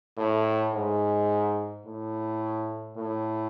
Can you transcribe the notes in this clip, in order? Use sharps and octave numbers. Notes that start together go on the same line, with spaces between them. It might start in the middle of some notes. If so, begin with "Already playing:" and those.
A2
G#2
A2
A2